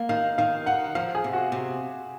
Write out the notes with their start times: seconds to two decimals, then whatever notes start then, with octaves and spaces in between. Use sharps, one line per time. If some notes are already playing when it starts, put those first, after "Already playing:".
Already playing: A#3
0.09 D#3 F5
0.38 D#3 F5
0.66 D#4 F#5
0.95 F3 F5
1.15 G#4
1.24 C3
1.33 F#4
1.52 C3